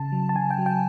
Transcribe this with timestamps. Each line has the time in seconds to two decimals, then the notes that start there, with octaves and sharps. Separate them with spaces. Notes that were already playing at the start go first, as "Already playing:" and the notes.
Already playing: C#3 A5
0.12 F#3
0.29 A5
0.35 C#3 G#5
0.51 G5
0.58 F#3
0.66 G5